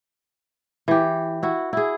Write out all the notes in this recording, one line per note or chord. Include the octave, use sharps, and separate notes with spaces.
E3 G4
E4 F#4
E4 G#4